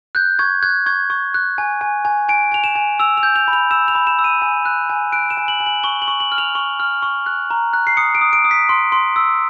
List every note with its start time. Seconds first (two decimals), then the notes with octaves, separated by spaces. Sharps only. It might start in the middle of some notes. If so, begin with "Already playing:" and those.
0.15 F#6 G6
0.39 C#6 G#6
0.62 F#6 G#6
0.86 C#6 G#6
1.10 C#6
1.34 F#6
1.58 G#5
1.81 G#5
2.05 G#5
2.29 G#5 D7
2.52 G#5 F7
2.64 E7
2.75 G#5
3.00 E6 F7
3.17 F7
3.23 G6
3.36 F7
3.48 B5
3.53 F7
3.71 E6 E7
3.88 F7
3.95 B5
4.07 E7
4.19 E6
4.24 D#7
4.42 G#5
4.65 F#6
4.90 G#5
5.12 F#6 D7
5.30 E7
5.37 G#5
5.48 F#7
5.60 G#5
5.66 F#7
5.84 C#6 G7
6.02 F#7
6.08 C#6
6.20 F#7
6.32 F6
6.38 F7
6.55 C#6
6.80 F6
7.02 C#6
7.26 F#6
7.50 A#5
7.73 F#6
7.87 C7
7.97 D#6 C#7
8.15 D7
8.21 D#6
8.33 D7
8.45 D#6
8.51 B6
8.69 C6
8.92 C6
9.16 E6